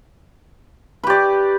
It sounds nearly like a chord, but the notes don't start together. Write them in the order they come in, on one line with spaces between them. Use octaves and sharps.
B4 G4 D5